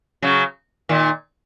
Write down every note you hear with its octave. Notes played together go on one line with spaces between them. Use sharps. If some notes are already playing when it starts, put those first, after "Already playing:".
C#3 F#3
A#2 D#3